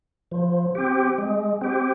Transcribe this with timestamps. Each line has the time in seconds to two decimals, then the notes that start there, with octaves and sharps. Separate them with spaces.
0.31 F3
0.75 C4 G4
1.18 G#3
1.61 C4 G4